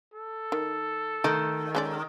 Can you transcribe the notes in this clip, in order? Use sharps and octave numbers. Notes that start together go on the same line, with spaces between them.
A4
D#3
D#3 A3 D#5
G#3 C#4 D5